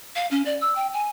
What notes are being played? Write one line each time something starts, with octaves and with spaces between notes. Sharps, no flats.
F5
C#4
D5
E6
G5
G#5